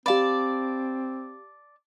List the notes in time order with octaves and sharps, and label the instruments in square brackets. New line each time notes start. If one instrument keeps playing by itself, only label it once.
[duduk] C4 [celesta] G4 F5 B5 [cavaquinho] D5 A5